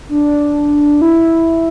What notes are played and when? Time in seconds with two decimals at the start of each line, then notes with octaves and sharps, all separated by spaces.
0.09 D4
1.02 E4